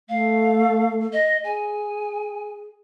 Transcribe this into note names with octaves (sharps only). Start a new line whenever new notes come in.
A3 F5
D#5
G#4 G#5